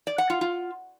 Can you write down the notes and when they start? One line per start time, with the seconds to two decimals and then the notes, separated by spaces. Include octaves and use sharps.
0.07 D5
0.18 F#5
0.30 F4
0.41 F4